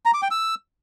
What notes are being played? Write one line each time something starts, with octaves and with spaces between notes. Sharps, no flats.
A#5
D6
G5
E6